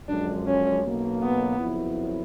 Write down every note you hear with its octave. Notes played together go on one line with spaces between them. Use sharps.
F#2 D3 F3 G#3 D4
C#4
B1 B2 F#3 A#3
B3
F2 C#3 F#3 B3 E4